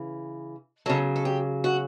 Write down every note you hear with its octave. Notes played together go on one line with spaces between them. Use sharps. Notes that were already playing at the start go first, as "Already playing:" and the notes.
Already playing: C#3 E3
C#3 F#3 A4
A4
G4
F#4